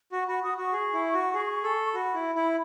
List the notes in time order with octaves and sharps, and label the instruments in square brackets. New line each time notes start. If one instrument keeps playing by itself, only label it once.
[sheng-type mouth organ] F#4 [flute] C#6
[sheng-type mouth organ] F#4 [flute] B5
[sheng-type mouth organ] F#4 [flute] D#6
[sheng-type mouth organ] F#4 [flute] C#6
[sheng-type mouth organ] G#4
E4
F#4
G#4
A4
[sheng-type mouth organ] F#4 [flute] B5
[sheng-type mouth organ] E4
E4